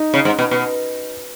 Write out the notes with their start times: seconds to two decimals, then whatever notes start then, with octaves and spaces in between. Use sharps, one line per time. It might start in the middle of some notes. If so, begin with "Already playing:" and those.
Already playing: D#4
0.14 C#3
0.25 G#2
0.39 B2
0.51 B2